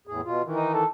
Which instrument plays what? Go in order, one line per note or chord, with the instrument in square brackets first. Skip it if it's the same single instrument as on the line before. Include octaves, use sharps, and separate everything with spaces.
[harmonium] E2 A2 G#4
B2 F4
D#3 E3
[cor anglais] D#4
A4